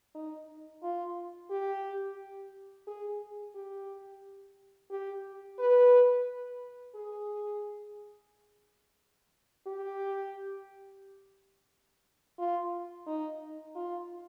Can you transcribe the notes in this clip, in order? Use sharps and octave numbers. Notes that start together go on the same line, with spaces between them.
D#4
F4
G4
G#4
G4
G4
B4
G#4
G4
F4
D#4
F4